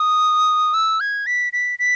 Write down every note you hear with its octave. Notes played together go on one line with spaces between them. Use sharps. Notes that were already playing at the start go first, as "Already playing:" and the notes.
Already playing: D#6
E6
G#6
B6
B6
B6